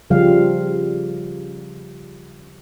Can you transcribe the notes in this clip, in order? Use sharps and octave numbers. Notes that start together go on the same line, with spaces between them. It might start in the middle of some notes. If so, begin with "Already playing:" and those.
C#3 F3 G3 F5